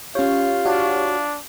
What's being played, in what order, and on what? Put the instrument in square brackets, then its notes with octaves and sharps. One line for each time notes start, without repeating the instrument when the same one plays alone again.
[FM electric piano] C#4 C#5 [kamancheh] F4 [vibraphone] G4
[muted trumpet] D4 [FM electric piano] F#4 C#5